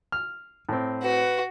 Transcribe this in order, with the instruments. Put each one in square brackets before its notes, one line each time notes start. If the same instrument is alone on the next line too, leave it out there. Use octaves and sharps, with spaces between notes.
[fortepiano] F6
A2 C4
[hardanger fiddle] F#4 [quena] B4